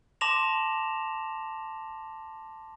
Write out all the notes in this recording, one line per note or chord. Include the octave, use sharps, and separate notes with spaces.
A5 C6 D6 A#6 E7 F7